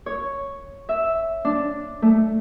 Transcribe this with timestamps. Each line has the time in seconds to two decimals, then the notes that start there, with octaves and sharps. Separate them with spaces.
0.06 C#5
0.89 E5
1.45 D4
2.02 A3